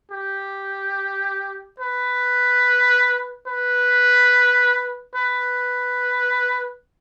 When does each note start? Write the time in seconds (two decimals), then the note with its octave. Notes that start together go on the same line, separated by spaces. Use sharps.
0.12 G4
1.80 B4
3.47 B4
5.16 B4